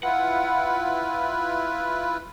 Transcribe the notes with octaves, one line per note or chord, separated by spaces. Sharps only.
E4 F4 B4 F#5